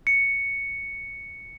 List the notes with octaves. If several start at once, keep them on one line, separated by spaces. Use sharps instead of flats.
C#7